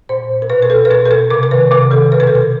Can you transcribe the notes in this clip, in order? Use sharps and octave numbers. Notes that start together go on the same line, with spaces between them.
A#2 C5
A#4
B2 B4
A#4
A4
B4
B2 A#4
A4
A#4
C3 A#4
A#4
D#3 B4
C3 A#4
D#3 A4
B2 B4
A#4
A4
A#4